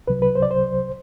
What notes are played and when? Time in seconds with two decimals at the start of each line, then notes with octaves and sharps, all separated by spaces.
0.07 C2 C3 F#3 B4
0.22 B4
0.35 C5
0.42 D5
0.51 C5